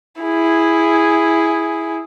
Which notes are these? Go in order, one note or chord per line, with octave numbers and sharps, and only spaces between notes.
E4 G#4